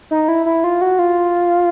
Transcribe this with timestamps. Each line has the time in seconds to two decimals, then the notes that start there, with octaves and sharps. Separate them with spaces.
0.11 D#4
0.28 E4
0.46 E4
0.64 F4
0.81 F#4
0.99 F4